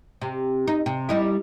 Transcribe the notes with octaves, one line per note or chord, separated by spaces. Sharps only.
C3
D#4
C3
G3 D#4 E4